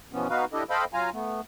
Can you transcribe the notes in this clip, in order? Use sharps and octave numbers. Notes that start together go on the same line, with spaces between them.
B2 E3 F3 B3 C#4
B3 D#4 F#4 B4 F5
D4 E4 G4 A4 D#5
A4 C5 D#5 F5 G5 B5
F#3 F4 F5 G#5 A#5
A3 B3